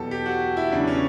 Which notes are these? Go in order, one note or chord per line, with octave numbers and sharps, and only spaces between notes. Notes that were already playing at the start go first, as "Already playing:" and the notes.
Already playing: E2 B2 F#3 G4 A4
G4
F#4
E4
E2 C#3 F#3 D4
C#4